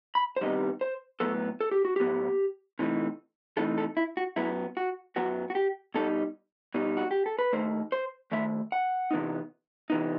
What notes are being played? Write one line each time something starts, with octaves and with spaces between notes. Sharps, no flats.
B5
C5
C2 C3 D#3 G3 B3 D#5
C5
A2 F#3 B3 A4
A4
G4
F#4
A2 F#3 B3 G4
C3 E3 A3 D#4
C3 E3 A3 D#4 A4
A4
E4
F#4
F#2 F#3 B3 E4
F#4
F#2 F#3 B3 F#4
F#4
G4
B2 G3 D#4 A4
B2 G3 D#4
F#4
G4
A4
B4
D#2 D#3 A3 C5
C5
D#2 D#3 A3 E5
F#5
C3 E3 B3 D#4
C3 E3 B3 D#4